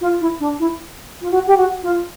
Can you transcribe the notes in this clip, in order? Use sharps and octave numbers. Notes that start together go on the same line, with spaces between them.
F4
E4
D4
E4
F4
F#4
G4
F#4
F4